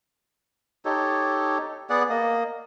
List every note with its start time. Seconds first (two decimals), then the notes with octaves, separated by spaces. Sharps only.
0.85 D#4 G4 A4 C#5
1.90 B3 G#4 D5 F#5
2.09 A#3 D#5